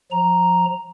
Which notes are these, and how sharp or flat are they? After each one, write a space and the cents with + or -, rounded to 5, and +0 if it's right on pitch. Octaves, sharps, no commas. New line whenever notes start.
F3 +20 A#5 +0